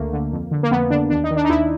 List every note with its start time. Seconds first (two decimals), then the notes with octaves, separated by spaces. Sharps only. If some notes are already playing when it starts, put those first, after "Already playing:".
Already playing: D2 D3 A3 A#3
0.13 D3
0.32 F2
0.51 D3
0.63 A#3
0.71 F2 B3
0.90 D3 D4
1.10 D#2 D4
1.24 D#4
1.31 D#3
1.37 D4
1.45 D#4
1.49 D#2 E4